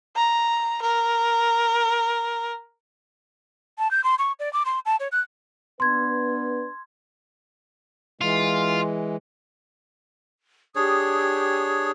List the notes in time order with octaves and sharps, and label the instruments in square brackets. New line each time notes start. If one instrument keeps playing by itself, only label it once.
[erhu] A#5
A#4
[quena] A5
G6
C6
C#6
D5
D6
C6
A5
C#5
F#6
[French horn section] B3 D4 B4 [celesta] C6 G#6
[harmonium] E3 G#3 [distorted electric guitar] F4
[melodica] D4 G#4 C#5 [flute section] G4 D#6